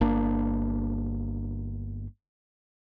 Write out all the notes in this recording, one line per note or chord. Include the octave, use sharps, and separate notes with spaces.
G1 A#3 D4